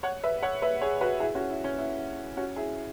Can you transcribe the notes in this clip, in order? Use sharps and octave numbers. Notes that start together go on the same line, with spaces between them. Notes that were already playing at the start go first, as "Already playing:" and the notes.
C#5 F#5
B4 E5
C#5 F#5
B4 E5
G#4 C#5
F#4 B4
E4 G#4
C#4 F#4
E4
C#4
E4
C#4 F#4
E4 G#4